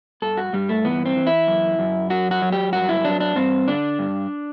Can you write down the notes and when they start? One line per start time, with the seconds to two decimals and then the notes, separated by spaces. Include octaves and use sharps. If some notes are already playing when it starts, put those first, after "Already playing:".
0.22 G2 A4
0.37 F#4
0.53 G2 G3
0.69 A3
0.85 E3 B3
1.06 C4
1.16 E3
1.27 E4
1.47 F#2
1.79 F#2
2.10 F#3 F#4
2.31 F#4
2.42 F#3
2.52 G4
2.73 G2 F#4
2.89 E4
3.05 F#3 D4
3.20 D4
3.36 G2 C4
3.67 D3 D4
3.99 G2